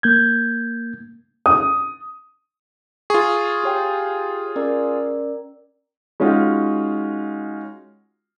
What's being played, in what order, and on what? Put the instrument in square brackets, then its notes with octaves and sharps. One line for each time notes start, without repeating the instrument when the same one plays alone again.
[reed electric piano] A#3 G6 G#6
[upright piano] D#6
[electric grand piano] F4 G#4 [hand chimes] C#6
[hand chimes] G4 C#5 G5
C#4 A#4 D5
[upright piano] G#3 C#4 D#4 F4 F#4